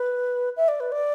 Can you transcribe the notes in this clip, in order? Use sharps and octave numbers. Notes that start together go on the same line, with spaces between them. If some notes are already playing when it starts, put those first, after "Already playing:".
Already playing: B4
E5
D5
B4
D5